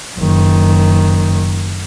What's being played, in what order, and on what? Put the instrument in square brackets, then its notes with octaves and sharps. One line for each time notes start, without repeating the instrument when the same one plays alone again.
[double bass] F#1 D#3